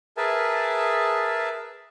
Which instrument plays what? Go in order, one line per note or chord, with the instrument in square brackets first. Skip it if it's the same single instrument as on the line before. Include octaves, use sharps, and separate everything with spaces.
[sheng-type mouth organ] G#4 A#4 B4 E5 G#5 A5